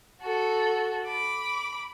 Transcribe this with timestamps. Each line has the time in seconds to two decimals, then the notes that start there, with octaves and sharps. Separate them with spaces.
0.21 F#4 A4
1.06 B5 D6